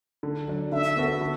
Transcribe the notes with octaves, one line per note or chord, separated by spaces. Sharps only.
D3
F#3 D4
D3 E5
B3 F#4 A4
D3